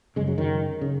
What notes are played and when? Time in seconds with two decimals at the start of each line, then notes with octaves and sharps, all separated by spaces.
0.16 F#2 C#3 G#3
0.28 F#3
0.38 D#3
0.81 C#3